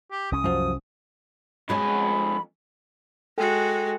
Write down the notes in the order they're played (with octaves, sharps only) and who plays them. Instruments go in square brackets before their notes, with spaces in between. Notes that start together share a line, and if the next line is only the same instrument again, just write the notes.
[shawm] G4
[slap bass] C2 C#4 [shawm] D#6
[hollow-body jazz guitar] F#2 F3
[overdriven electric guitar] F2 G#5 [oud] B2 G#3 C#4 [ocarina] B5
[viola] G#3 F#4 [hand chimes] A4 G5 G#5